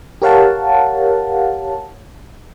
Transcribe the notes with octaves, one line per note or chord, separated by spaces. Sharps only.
G4 A#4 C#5 F5 F#5 A5